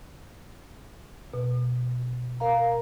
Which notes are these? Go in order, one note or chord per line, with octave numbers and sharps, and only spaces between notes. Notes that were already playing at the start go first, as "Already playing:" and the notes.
B2
A#4 F5 A#5